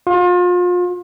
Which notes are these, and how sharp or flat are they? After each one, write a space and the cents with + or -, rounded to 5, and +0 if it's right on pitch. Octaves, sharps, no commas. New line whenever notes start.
F4 +35